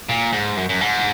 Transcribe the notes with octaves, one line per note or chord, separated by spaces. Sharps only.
A#2
G#2
F#2
F#2
G#2